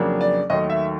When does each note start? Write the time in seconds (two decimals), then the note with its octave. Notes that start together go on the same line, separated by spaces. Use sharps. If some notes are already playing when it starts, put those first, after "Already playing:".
Already playing: F2 C#3 F#3 A#3 D4
0.21 D5
0.50 D#2 D#3 F#3 A3 D#5
0.70 E5